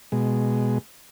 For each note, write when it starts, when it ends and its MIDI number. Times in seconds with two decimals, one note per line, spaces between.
0.12 0.78 47
0.12 0.78 56